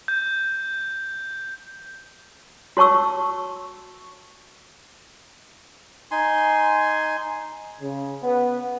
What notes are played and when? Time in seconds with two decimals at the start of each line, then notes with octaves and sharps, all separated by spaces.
0.08 G6
2.77 F#4 C#5 A5 C#6 E6
6.11 D#4 G#5 C6
7.81 C#3
8.23 B3